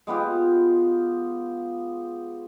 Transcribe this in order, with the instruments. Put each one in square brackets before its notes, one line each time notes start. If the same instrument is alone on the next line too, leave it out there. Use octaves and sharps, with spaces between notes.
[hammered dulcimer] G#3 B3 F4 G4